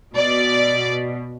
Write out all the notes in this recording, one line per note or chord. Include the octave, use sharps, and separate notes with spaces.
B2 D5